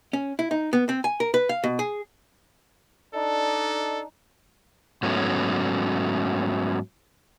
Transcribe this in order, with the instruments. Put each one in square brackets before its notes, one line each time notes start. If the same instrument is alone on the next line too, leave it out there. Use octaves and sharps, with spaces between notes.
[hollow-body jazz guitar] C#4
E4
D#4
B3
C4
G#5
A#4
B4
F5
B2
G#4
[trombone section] D4 D#4 [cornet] A4
[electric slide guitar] G#2 F#3 A3 B3 C#4